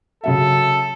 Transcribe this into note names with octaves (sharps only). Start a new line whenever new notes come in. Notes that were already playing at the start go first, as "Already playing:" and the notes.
C#3 F#3 A4 E5